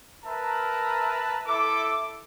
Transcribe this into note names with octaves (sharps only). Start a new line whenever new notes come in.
A#4 B4 E5 A5 A#5
E4 A4 E5 D6